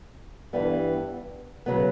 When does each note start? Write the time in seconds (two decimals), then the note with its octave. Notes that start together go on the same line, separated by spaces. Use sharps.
0.53 G2 E3 G3 B3
1.66 C#3 F#3 B3